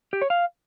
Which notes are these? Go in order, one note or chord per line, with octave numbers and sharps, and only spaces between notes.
G4
C#5
F5